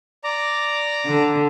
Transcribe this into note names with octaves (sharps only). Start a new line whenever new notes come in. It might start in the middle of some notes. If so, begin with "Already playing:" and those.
D5 A#5
D3